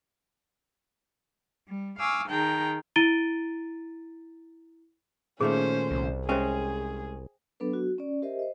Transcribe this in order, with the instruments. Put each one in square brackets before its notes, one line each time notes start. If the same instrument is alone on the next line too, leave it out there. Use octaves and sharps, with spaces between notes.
[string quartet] G3
F5 G#5 C#6 D6 E6
D#3 G#4 G5 A5 A#5
[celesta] E4 A#5 A6 D7 D#7 G7
[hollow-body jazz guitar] A#2 D#3 A3 [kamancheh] C#4 C5 [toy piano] G#4
[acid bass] C2
[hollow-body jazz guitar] G#3 C#4 [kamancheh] G#4 [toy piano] C5 E5 G5
[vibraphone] F#3 B3 D4 A4 B4
F#4
C#4 D5
G4 A#4 C5 D#5 E5
C5 D#5